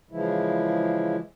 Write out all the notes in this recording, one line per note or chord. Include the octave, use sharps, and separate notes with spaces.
C#3 E3 F3 G#3 E4